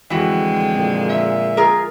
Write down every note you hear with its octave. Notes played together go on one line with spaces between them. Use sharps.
F2 D3 E3 G#3 F#4 G5
A#2
E5
F4 G#4 A#4